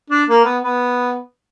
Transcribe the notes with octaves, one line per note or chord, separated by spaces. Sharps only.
D4
A#3
B3
B3